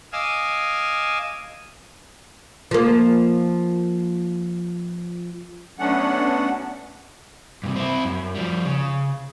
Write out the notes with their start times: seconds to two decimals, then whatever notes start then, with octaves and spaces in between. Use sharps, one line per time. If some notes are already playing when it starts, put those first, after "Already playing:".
0.12 D#5 F5 G#5 D6 E6
2.71 F3 A#3
5.79 F#3 A3 B3 C#4 D4 F#5
7.64 G2 C3
7.76 C4 E4
8.05 F#2
8.35 F3 G3
8.65 C#3